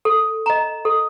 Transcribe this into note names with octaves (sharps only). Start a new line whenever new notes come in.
A4
D#5 A#5
A4